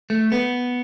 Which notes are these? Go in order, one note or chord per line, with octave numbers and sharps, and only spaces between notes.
A3
B3